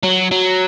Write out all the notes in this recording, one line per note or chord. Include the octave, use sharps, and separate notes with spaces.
F#3
F#3